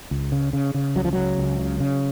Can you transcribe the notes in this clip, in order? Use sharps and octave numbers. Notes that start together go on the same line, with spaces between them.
C#2
C#3
C#3
C#3
C#2 F#3
F3
C#3 F#3
C#2
C#3
C#3